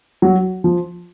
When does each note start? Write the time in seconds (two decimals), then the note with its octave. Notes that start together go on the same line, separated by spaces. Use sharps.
0.22 F#3
0.64 F3